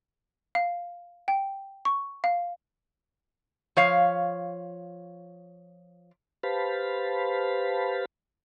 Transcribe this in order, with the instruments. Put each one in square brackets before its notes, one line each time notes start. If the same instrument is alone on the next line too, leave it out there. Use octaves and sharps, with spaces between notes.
[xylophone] F5
G5
C#6
F5
[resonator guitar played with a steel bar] F3 C#5 F5
[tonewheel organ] G4 B4 C5 F5 A5 B5